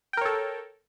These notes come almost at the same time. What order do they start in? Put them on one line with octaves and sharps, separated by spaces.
G5 A#4 C#5 A4